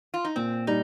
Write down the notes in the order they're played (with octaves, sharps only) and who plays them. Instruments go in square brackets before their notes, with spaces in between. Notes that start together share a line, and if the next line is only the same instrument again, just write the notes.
[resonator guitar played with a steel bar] F4
D#4
[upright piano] A#2 [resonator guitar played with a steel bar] C4
[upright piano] G3 [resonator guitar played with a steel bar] D#4